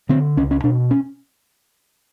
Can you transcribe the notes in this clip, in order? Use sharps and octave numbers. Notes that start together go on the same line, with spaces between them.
D3 C4
C#2 C#4
C#4
B2 D4
C#4